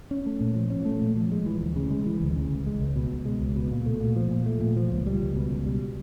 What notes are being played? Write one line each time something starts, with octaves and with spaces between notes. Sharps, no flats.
C#4
A3
A#2
F3
C#4
A3
A#2
F3
G#3
E3
D2
C#3
G#3
E3
D2
C#3
C#2
G#3
C#2
B2
C#2
G#3
C#2
B2
A#2
A3
A#2
F3
A#2
A3
A#2
F3
C#2
G3
C#2
B2
C#2
G3